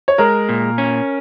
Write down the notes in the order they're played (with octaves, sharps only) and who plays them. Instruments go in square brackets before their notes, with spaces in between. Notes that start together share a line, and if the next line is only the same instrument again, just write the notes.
[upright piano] C#5
[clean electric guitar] G#3 [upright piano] A#4
[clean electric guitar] A#2
C#4